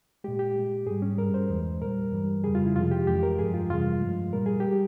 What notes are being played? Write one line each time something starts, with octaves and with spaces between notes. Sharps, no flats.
A#2 G#3 G4
G4
A#2 G#3
G#2 G3 G#4
C#4
G2 G3 A#4
C5
E2 E3 G#3
A#2 G3 A#4
G2 E3 G3
F2 C#3 G3 G#4
F4
E4
F2 C3 F3 G#3 F4
G4
F2 E3 G#3 G4
A#4
G2 F3 G#3 G#4
F4
F2 C3 E3 G3 F4
G2 F3 G#3
A#2 G3 A#4
G#4
G3 G4